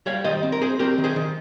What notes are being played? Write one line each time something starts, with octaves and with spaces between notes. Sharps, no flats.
G3 C#5 F5
D#3 C5 D#5
C4
A#4
C4 G#4 C5
C4 G4 A#4
D#3
G#4 C5
D#3